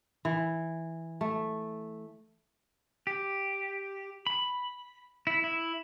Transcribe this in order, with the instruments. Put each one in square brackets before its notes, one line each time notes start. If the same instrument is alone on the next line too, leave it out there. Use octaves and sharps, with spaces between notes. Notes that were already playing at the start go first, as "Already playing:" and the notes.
[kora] E3
A3
[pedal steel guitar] G4
B5
E4
E4